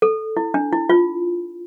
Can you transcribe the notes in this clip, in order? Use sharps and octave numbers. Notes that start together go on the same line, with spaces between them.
A4
E4
D4
E4
F4